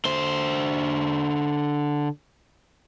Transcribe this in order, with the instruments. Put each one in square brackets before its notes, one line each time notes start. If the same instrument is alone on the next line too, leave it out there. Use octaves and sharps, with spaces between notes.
[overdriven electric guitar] D3 C5